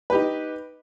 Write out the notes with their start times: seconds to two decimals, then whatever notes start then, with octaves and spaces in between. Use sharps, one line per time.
0.10 B4
0.12 G4
0.15 D#4